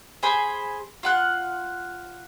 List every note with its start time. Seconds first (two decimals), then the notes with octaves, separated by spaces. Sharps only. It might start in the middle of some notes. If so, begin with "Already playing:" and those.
0.23 G#4 C5 B5
1.03 F4 F#5 F#6